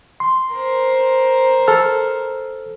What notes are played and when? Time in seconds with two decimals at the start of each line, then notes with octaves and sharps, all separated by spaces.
0.20 C6
0.52 A#4 C5
1.68 A4 F6